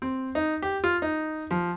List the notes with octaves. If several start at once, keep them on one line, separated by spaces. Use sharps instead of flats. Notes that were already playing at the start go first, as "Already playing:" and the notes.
C4
D#4
G4
F4
D#4
F3